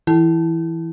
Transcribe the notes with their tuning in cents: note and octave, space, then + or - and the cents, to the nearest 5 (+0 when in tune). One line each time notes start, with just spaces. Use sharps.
E3 +0 E4 +0